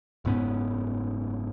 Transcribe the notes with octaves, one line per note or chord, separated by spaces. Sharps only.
F#1 G#2 B3 C#4